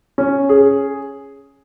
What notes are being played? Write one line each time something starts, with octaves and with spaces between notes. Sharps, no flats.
C#4
G#4